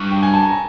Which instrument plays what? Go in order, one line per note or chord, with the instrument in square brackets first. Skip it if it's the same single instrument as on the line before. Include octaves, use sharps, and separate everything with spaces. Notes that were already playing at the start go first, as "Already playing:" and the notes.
Already playing: [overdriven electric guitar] G2 [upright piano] C#6
[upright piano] G5
G#5
A5
A#5